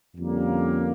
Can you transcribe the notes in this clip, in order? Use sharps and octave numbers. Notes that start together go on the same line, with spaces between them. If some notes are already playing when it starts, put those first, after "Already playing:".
F2 D3 G3 A#3 C#4